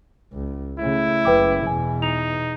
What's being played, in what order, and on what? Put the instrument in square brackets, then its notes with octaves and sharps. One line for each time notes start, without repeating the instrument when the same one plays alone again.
[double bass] C#2
[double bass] C#3 A3 [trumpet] E4
[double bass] F#1 [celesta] B4 G5 D6
[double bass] E2 B2 [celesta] G#5
[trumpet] D#4 [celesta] F7